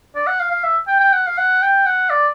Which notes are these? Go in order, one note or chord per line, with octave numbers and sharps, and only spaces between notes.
D5
F#5
F5
F5
E5
G5
G5
F#5
F5
F#5
G5
F#5
D5